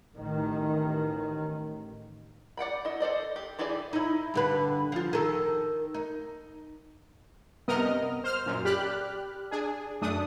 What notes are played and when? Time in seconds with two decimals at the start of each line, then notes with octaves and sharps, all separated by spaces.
0.15 A1 D#3
2.57 D5 F#5 G5 B5
2.85 E4 D#5
3.00 A4 C5 D5 D#5
3.36 G4
3.59 E3 E4 G4 G#4 D5
3.93 D#4 E4
4.34 G2 D3 B4
4.92 F3 F4
5.13 D#3 A4
5.94 D#4
7.68 G2 C3 B3 A#4 D#5 F6
8.24 C5 F6
8.46 F#2 A#2
8.65 G4 D5 B5 F6 F#6
9.51 D4 G#4
10.01 F#2 A3 D4 D#6